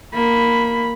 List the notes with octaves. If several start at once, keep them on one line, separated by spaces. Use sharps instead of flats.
A#3 B5